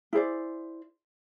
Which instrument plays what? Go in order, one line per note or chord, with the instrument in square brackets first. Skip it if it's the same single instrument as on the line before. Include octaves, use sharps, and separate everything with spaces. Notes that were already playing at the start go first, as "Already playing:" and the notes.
[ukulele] E4 G#4 C5 D5